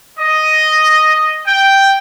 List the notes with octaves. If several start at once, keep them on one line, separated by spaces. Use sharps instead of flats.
D#5
G5